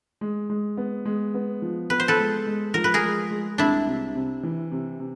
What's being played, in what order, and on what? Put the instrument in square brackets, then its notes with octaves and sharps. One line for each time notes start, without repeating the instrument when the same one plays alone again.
[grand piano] G#3
G#3
B3
G#3
B3
F3
[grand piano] B3 [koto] B4
[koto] C5
A4 B4
[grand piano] G#3
G#3
[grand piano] F3 [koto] A#4
[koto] B4
G#4 A#4
[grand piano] G#3
G#3
[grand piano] C2 [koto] D4 E4
[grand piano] C3
C3
E3
C3
C3